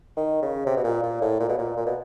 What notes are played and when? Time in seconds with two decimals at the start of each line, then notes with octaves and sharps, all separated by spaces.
0.17 D#3
0.42 C#3
0.67 C3
0.77 B2
0.84 A#2
1.03 A#2
1.22 A2
1.40 A#2
1.49 B2
1.58 A#2
1.77 A#2
1.86 B2